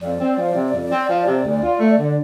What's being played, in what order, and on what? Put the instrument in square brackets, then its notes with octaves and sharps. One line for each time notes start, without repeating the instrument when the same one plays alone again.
[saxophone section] F2 [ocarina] D5
[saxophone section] C4
F3
C3
F2
C4
F3
C3
D2
F4
A3
D3